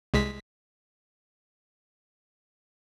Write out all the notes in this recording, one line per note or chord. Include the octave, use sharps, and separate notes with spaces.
C2 G#3 B6